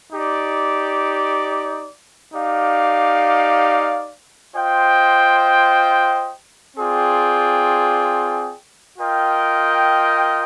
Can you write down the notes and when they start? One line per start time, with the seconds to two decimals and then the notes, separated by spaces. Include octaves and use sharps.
0.12 D#4 G4 D5
2.33 D#4 G4 D5 F5
4.55 F4 C5 D#5 G5
6.77 C4 F4 G#4 D5 G5
8.98 F4 A#4 D#5 G5